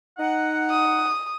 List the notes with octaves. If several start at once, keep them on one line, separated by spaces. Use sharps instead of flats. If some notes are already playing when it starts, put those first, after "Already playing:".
D#4 F#5
D#6